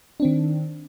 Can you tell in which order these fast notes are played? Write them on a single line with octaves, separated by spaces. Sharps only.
D4 C4 D#3